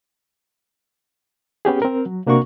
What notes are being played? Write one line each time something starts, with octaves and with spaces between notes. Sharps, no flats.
B3 C#4 G4 G#4
C4 A#4
F#3
C3 A#3 D4 F#4 A#4 C#6